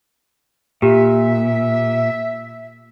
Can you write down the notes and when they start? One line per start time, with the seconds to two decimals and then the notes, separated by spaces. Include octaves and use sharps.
0.82 A#2 G4 E5